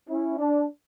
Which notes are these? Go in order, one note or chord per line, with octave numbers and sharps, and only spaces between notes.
C#4 E4
D4